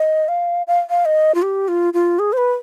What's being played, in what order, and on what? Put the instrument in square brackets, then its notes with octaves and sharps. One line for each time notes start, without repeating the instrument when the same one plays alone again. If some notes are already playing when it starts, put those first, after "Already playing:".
Already playing: [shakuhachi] D#5
F5
F5
F5
D#5
F4
G4
F4
F4
G#4
C5
B4